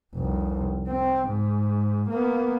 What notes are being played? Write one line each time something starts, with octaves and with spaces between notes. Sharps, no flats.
F1 C2
C4
G#2
A#3 B3